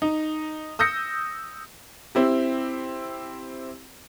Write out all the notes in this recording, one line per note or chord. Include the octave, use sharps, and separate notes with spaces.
D#4
D#6 E6 G6 A#6 C#7
C4 E4 G4